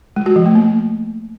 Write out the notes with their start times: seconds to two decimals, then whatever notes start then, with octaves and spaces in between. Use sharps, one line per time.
0.16 G#3
0.26 F#4
0.36 F3
0.46 A3
0.55 A#3